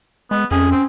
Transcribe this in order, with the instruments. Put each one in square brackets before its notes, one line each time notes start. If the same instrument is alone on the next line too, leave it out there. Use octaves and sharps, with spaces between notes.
[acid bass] G#3 [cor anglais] B3
[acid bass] F2 [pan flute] C#4 [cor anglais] G#4
[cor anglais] C4